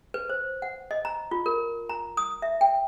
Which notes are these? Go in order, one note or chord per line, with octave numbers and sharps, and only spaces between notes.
B4
C5
F#5
D#5
A#5
F4
A#4
A#5
D#6
E5
G5